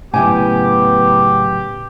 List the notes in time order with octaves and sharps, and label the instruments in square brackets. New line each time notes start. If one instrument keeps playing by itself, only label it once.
[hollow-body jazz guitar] A2 C#3 F#3 [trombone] B3 [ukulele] E4 G#5 [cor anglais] G4